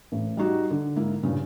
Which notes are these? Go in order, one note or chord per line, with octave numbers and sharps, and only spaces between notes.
A1
G3 D#4 F#4
D3
G#2 A#3 E4
G2 A#2 C#3